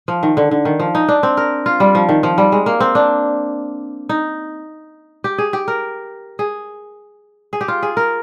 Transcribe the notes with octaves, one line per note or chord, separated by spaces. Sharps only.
F3
D#3
D3
D3
D#3
F3
D#4
D4
C4
A#4
F4
G3
F3
D#3
F3
G3
G#3
A#3
C4
D4
D#4
G4
G#4
G4
A#4
G#4
G#4
G4
F4
G#4
A#4